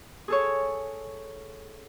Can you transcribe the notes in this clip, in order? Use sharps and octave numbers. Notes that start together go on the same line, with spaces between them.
G#4 A4 C#5